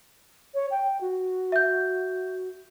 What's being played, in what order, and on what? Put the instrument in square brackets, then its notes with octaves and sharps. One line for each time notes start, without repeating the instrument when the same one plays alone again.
[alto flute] C#5
G5
F#4
[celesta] E5 G6